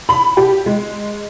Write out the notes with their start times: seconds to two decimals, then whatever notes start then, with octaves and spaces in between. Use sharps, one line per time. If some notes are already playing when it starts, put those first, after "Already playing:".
0.09 B5
0.37 G4
0.66 G#3